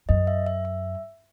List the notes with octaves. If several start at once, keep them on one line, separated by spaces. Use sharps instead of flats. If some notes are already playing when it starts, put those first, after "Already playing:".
F#2 D#5
E5
E5
E5